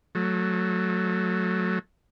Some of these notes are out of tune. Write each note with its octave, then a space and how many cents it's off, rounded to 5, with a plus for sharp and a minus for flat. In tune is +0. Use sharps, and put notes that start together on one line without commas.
F#3 -10 A3 +0